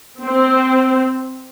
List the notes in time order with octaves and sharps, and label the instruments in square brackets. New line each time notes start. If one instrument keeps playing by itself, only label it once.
[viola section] C4